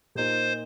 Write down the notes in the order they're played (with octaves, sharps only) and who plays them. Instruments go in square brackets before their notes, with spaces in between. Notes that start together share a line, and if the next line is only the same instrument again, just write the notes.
[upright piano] A#2 A#3 D#4 A#4 [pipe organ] C5